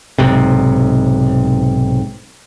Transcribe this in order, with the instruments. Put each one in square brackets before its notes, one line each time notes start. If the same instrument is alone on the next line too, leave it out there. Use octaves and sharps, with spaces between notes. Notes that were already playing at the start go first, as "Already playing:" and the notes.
[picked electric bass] B1 G#2 C3